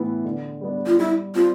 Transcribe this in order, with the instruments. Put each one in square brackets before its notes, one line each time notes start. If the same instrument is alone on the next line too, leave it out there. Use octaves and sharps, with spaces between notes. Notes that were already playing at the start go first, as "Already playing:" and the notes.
Already playing: [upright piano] A2 E3 B3 E4 B4
D3
G3 B3 D4
[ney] F4
[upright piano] G3 [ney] E4
[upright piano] C4 G4 D5 [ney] F4